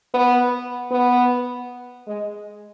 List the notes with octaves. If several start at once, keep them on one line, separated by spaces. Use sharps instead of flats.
B3
B3
G#3